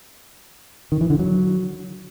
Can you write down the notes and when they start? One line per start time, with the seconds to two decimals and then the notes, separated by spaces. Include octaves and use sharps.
0.92 D#3
1.01 E3
1.10 D3
1.19 F#3